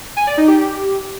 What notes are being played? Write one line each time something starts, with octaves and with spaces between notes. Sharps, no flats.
G#5
D5
D#4
G4